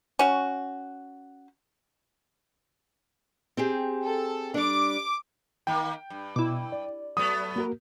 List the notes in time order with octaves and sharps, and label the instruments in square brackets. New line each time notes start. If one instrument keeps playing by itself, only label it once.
[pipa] C#4 F#4
[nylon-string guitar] C4 G4 G#4
[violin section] A4
[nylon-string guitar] G3 D4 [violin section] D6
[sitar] D#3 A#3 [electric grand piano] G5
[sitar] G2
[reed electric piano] B2 [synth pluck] E4 D6
[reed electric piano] D5
[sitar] F#3 A3 B3 [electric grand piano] D#6
[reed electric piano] A#3 F#4 A#4